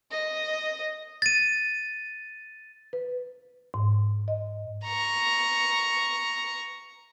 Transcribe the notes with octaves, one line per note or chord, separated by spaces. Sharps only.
D#5
A6 D#7
B4
G#2
D#5
A#5 C#6